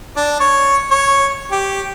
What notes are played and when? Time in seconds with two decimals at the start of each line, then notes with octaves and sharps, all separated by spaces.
0.17 D4
0.40 C#5
0.91 C#5
1.52 G4